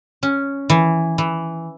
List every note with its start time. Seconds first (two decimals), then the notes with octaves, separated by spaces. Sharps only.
0.23 C#4
0.70 E3
1.18 E3